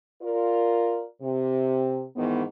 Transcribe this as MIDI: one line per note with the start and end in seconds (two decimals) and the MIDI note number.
0.22 1.06 65
0.22 1.06 70
0.22 1.06 74
1.22 2.04 48
2.16 2.43 44
2.16 2.43 51
2.16 2.43 52
2.16 2.43 59